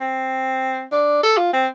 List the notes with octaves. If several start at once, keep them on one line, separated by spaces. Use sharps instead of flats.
C4
D4
A4
F4
C4